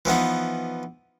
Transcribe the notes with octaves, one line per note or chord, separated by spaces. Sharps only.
E3 F3 B3 D#4